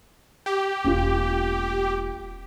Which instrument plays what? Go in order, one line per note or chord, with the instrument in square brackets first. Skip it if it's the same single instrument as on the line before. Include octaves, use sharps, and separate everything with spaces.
[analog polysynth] G4
[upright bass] E1 A#3 [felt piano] C#4 F4